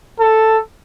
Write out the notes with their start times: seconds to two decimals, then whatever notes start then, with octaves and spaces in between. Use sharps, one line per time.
0.20 A4